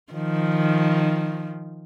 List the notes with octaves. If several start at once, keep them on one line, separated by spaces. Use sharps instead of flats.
D#3 F3